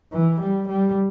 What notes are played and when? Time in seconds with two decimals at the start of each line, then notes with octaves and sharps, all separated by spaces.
0.12 E3
0.41 G3
0.69 G3